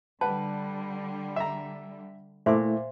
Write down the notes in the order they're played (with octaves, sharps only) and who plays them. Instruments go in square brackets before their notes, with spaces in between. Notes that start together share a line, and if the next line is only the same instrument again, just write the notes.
[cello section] D3 G3 [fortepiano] B4 F#5 [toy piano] A5
[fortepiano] E5 A#5
[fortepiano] A#2 D6 [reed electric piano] A3 E4 [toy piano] C5 E5 C6